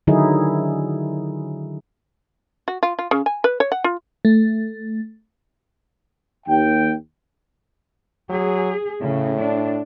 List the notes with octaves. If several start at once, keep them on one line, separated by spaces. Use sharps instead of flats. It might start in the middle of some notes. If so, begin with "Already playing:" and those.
D3 D#3 F#3 D#4 E4 G#4
F#4
F4
F4
C#3
G#5
B4
C#5
F#5
F4
A3
D#2 G5
F#3 G#4
A2 C#3
D4